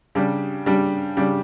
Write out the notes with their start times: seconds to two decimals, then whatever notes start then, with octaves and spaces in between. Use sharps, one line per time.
0.15 C#3 G3 D4 G4
0.66 C#3 G3 D4 G4
1.17 C#3 G3 D4 G4